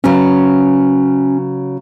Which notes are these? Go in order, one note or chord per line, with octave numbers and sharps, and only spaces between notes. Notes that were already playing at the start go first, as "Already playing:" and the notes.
C#3 F#3 B3 C#4